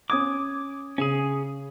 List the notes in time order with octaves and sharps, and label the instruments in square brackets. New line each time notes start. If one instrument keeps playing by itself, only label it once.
[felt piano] C#4 D#6 G#6 [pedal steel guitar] D6
[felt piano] C#3 [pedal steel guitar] C#4 G#4